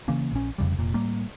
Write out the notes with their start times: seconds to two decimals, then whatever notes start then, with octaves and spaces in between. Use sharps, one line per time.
0.08 C#3 E3 A#3 C#4
0.32 A#1 C#4
0.58 F1 F2 C#3 G3
0.79 F1 A#2
0.94 A2 G3 A#3